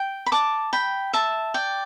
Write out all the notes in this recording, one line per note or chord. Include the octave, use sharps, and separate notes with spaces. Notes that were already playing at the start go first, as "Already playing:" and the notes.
Already playing: G5
B5
A5 D6
G5 B5
E5 A5
D5 G5